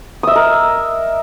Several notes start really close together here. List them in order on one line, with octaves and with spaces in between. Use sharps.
D#6 E5 D#5 A#4